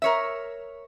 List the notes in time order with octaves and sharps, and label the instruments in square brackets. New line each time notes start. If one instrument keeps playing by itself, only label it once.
[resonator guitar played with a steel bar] A#4 C#5 E5